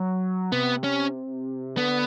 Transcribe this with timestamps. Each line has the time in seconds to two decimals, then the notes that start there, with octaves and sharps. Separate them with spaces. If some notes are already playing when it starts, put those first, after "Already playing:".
Already playing: F#3
0.52 C3 B3
0.84 C#4
1.77 D3 B3